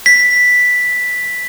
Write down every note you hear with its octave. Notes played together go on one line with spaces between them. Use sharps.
B6